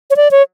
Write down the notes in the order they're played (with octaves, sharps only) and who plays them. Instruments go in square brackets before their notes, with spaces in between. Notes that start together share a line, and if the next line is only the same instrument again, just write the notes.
[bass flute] C#5
D5
C#5